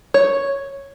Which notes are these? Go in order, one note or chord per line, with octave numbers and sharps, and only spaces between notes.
C#5